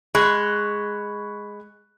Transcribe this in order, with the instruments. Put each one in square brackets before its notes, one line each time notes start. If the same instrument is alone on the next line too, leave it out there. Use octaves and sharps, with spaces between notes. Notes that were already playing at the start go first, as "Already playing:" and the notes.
[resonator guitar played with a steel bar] G#3 [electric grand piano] B5 C#6 F#6